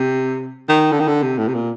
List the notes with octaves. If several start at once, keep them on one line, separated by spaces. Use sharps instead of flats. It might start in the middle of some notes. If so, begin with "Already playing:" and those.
Already playing: C3
D#3
D3
D#3
D3
C3
A2
C3
A#2